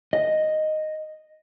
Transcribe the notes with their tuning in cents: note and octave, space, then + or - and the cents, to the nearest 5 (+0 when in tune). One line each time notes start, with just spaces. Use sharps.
D#5 -5